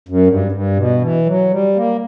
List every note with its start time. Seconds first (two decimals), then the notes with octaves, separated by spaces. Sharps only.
0.09 F#2
0.27 G2
0.52 G2
0.77 B2
1.02 E3
1.26 F#3
1.52 G3
1.76 A#3